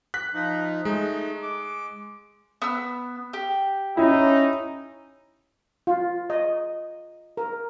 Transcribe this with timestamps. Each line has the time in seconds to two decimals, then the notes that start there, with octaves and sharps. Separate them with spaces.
0.14 F#6 B6
0.34 F3 D#4
0.85 G#3 A3 D#4
1.42 D6
2.62 B3 E6
3.33 G4
3.97 C#4 D#4 E4
5.87 F4
6.30 D#5
7.37 A#4